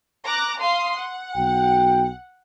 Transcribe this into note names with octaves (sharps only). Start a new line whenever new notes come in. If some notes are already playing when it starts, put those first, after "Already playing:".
A#5 D6 F#6
F5 C6 D#6
F#5
B1 F#4 G5